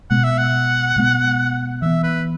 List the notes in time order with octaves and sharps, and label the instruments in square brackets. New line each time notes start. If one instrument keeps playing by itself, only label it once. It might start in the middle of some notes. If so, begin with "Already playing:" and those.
[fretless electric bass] B2 G#3 B3 [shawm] F#5
[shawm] E5
F#5
[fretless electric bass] B2 G#3 B3
[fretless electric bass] E3 B3 [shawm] E5
[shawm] B4